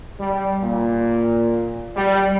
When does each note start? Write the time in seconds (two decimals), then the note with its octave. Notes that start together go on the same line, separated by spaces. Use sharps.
0.20 G3
0.62 A#2
1.96 G3